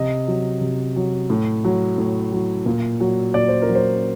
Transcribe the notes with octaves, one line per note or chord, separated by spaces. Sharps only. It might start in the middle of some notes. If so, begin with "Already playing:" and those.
Already playing: C3 D#5
F#3
C3
F#3
A2
F#3
A2
F#3
A#2
F#3
A#2 D5
C5
A#4
F#3
C5